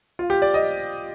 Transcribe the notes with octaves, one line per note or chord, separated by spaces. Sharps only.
F4
G4
D5
D#5